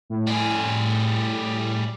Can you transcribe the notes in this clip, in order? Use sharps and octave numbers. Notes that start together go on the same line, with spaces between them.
A2
G3 G#4